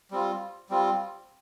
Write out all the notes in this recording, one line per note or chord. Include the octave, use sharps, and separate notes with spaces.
G3 C4 F4
G3 C4 F4